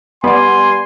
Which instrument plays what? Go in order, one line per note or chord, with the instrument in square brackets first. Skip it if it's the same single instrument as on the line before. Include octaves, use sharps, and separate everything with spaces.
[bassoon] G3 [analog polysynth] B3 D5 [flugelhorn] G#5 [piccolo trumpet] C6